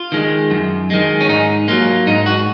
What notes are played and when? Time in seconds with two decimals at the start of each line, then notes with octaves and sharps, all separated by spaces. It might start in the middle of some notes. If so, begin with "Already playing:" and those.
Already playing: F4
0.12 D#3 G#3
0.51 F#2
0.90 D#3 G#3
1.21 C#4
1.28 G#2 D#4
1.68 F#3 A#3 F4
2.07 G#2 D#4
2.26 F#4